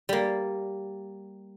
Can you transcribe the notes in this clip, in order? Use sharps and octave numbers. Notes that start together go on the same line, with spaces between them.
G3 A#3